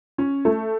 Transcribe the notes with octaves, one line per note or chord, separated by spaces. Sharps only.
C#4
A3